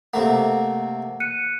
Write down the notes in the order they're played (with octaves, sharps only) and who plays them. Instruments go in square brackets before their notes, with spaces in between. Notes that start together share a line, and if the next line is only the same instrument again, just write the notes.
[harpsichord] C3 A3 A#3 [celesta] F#5
[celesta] F#6 C#7 D#7